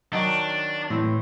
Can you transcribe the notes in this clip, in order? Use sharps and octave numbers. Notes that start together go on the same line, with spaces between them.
D#3 F#3 D4 D#4
A2 E3 C4